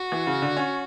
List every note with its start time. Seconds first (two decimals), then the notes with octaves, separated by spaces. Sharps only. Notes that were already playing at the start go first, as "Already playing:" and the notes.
Already playing: F#4
0.12 E3
0.27 C#3
0.42 D3
0.57 C#4